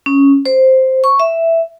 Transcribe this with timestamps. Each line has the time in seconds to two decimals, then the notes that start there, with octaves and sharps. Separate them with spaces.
0.06 C#4
0.46 C5
1.04 C#6
1.20 E5